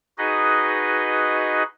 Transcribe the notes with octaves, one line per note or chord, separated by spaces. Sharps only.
D#4 F#4 G#4 B4 D#5